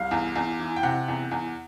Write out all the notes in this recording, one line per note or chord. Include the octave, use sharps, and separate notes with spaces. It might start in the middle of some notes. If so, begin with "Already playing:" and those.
Already playing: C2 F5
E2
E2
E3
G5
C3 F#5
E2
E2